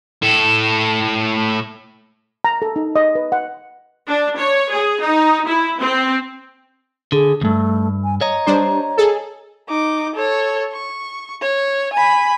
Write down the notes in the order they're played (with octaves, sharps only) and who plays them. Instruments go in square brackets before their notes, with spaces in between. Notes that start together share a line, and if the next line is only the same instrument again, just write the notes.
[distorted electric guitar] A2 A4
[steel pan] A#5
A4
D#4
D#5
B4
F#5
[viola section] D4
C#5
G#4
D#4
E4
C4
[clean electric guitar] D3 [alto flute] G#4
[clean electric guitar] D2 G2 [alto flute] A3
[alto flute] G#5
[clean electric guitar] C#5 D#5 [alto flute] A#5
[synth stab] G3 D4 C5
G#4 A4
[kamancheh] D#4 D6
A4 C#5
C#6
C#5
G#5 B5